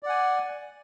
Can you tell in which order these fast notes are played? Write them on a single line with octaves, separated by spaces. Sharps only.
D5 F#5 G#5